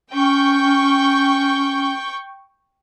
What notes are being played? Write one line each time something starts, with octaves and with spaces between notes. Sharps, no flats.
C#4 G5 C#6 G6